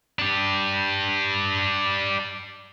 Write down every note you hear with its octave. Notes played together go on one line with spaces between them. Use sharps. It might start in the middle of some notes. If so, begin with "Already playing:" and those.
D4 G4